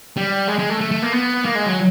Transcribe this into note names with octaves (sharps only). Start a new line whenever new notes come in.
G3
G#3
G#3
A3
A3
A3
A#3
B3
A#3
G#3
F#3